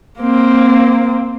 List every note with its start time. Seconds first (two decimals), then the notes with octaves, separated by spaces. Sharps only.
0.20 A#3 C4